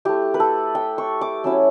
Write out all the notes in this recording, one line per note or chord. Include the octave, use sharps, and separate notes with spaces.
A3 E4 G4
B4
A4
G5
C#6
D6
F#3 C#4 E4 E6